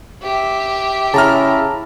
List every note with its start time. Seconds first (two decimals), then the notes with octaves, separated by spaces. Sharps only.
0.23 G4 E5
1.14 C#3 E4 A5 A#5 F6